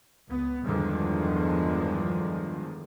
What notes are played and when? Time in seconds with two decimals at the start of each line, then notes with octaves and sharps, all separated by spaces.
0.28 C#2 B3
0.64 E2 G2 D3 D#3 F3 G#3